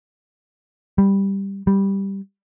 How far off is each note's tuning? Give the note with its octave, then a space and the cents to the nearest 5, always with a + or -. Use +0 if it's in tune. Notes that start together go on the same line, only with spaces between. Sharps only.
G3 +5
G3 +0